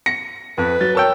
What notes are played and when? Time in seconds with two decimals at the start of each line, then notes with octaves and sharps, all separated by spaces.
0.06 A#6 C#7
0.58 F2 B4
0.81 F#3 A6
0.95 A#4 C#5 G5 A5 E6